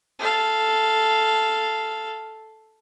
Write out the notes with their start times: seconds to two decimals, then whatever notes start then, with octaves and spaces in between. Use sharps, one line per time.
0.19 A4 F5